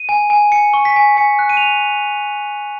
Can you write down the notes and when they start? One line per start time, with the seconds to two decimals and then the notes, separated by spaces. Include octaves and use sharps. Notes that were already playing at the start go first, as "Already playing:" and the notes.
Already playing: D#7
0.09 G#5
0.30 G#5
0.52 G#5 C#7
0.74 C#6
0.85 B6
0.96 G#5
1.17 G#5 C#7
1.39 F#6
1.49 D#7
1.57 F7